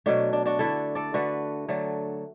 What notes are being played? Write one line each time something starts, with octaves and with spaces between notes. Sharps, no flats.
B2 F#3 A3 D4
D4
D4 F#4
D3 A3 E4 A4
A4 D5
D3 A3 F#4 B4
D3 F#3 A3